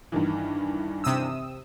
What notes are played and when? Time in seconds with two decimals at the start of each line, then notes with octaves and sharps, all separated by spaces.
0.12 G2 D#3 E3
1.04 C3 D#6 E6